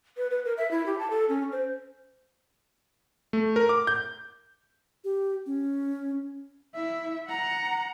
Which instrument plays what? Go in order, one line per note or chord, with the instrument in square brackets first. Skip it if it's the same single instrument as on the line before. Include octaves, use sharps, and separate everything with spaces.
[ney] B4
B4
A#4
E5
E4
G4
A5
A4
C#4
C5
[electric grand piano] A3
A#4
D6
G6
[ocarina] G4
C#4
[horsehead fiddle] E4 E5
F#5 A#5